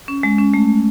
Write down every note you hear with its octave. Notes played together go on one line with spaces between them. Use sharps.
C#4
G#3
C#4
A3